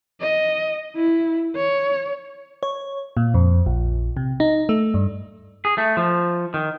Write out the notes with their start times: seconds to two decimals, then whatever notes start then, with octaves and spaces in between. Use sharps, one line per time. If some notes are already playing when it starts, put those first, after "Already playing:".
0.21 D#5
0.96 E4
1.56 C#5
2.63 C#5
3.17 A#2
3.34 F2
3.66 A#1
4.17 C3
4.40 D#4
4.69 A3
4.94 G2
5.65 G#4
5.78 A3
5.97 F3
6.54 D#3